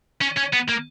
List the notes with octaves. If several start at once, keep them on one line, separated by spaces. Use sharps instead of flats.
C#4
C#4
B3
A#3